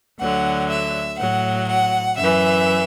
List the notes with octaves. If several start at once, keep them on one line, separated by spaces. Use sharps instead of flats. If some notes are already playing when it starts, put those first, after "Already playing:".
D2 D3 F#3 F#5
E5
A2 F#3 F#5
F#5
F#2 E3 E5